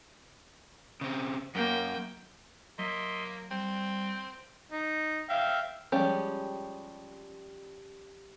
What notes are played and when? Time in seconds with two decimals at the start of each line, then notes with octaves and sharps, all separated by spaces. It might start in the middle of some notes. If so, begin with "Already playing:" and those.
1.01 C#3 C4
1.55 F#2 A#3 G5
2.78 F#3 A#3 D#5 E5 C6
3.51 G3 C4 G5
4.72 D#4
5.30 E5 F5 G5
5.92 F3 G3 G#3 C#4 G4